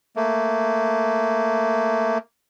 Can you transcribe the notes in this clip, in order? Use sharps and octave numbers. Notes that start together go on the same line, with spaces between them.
A3 A#3